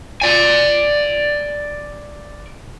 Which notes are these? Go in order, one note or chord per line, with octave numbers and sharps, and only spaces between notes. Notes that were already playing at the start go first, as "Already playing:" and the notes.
D5 G#5